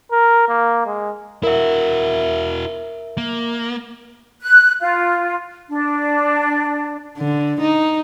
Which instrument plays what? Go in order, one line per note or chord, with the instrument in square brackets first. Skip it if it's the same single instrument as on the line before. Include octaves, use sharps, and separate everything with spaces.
[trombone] A#4
A#3
G#3
[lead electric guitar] E4 F#4 [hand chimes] A#4 E5
[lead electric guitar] A#3
[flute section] F#6
F4
D4
[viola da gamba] D3
D#4